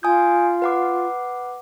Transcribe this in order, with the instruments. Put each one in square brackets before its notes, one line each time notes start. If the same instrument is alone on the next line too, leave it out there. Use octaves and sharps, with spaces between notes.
[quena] F4 [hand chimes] G#5 D#6 G6
[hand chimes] B4 F#5 D6